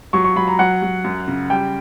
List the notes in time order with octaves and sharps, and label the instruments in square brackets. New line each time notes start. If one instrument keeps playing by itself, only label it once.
[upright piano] F#3 C#6
C#6
F#3 B5
A#5
F#3 F#5
F#3
F#2
C#3
G3 G5